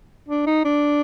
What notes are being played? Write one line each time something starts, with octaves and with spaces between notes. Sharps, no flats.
D4
D#4
D4